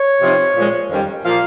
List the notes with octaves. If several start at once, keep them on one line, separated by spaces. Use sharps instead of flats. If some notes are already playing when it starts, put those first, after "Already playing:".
Already playing: C#5
C3 F3 C4 D#4
A#2 F3 G#3
F2 D#3 G3 C#4
A#2 F3 A#3 F4 F5